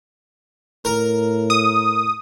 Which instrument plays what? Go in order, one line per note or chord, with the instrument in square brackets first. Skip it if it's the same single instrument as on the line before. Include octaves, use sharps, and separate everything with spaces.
[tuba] A2 [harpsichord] A#4
[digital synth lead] D#6